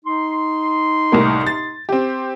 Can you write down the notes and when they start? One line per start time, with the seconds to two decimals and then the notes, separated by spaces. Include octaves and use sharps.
0.05 D#4 C6
1.12 C2 A2 A#3
1.47 A6
1.89 C4 G4